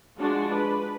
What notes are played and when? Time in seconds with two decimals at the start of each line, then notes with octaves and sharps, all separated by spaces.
0.17 F3 G#3 D4 F#4
0.54 B4